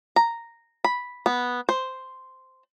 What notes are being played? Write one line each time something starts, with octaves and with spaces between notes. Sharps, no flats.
A#5
B5
B3
C5